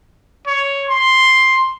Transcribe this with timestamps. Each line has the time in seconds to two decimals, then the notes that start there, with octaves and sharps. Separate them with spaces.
0.47 C#5
0.89 C6